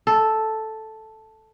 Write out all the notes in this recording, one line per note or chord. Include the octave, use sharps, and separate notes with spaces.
A4